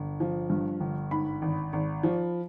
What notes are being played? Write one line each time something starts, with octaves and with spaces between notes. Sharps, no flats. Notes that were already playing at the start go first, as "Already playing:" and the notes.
Already playing: G1
F3
G2
G1
G#2 B5
G#1
G#1
F3